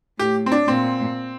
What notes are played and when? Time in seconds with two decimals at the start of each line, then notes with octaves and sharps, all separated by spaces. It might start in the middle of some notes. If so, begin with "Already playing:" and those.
0.19 A2 G4
0.46 C4
0.52 D4
0.68 A#2 C4